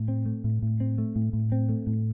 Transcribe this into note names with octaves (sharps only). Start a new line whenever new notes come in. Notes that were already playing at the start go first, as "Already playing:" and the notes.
Already playing: A2
C4
A3
A2
A2
C4
A3
A2
A2
C4
A3
A2